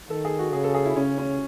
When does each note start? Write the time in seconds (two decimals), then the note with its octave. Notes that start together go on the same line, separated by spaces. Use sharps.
0.10 D#3 A4
0.25 G#4
0.39 F#4
0.53 C#3 G#4
0.64 A4
0.75 G#4
0.85 E4
0.96 C#3 C#4
1.18 C#4